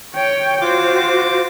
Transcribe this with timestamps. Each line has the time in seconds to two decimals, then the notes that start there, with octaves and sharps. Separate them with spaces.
0.14 C#5 G5
0.61 F4 F#4 C5 D6